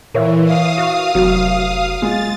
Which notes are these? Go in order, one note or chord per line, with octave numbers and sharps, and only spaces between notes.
A#2 E3 A#4 C#5 E5
F5 D#6
F#4
F1 F#3
G#3 F4 F5 A6